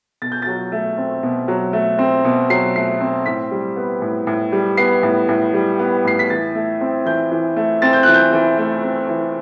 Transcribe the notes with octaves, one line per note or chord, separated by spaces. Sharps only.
B2 A6
G6
F#3 A6
A3
C4
B2
F#3
A3
C4
B2
F#3 C7
A3 C7
C4
A2 B6
G3
B3
A2
A2
G3
B3 C7
A2
A2
G3
B3
A2 C7
B6
E3 A6
A3
C4
E3 G6
E3
A3
C4 A6
G6
E3 F#6
G6
E3
A3
C4
E3